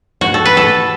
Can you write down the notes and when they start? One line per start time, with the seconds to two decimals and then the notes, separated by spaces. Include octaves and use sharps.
0.21 F#4
0.34 A4
0.45 B4
0.57 A4